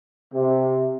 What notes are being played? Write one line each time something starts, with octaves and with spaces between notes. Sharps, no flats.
C3